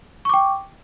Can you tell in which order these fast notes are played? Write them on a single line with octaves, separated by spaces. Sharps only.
C#6 D6 G5